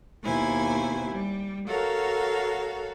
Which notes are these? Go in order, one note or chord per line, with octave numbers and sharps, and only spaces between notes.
D#2 B2 E4 C5 G#5
G3
F#4 A4 A#4 C#5 F5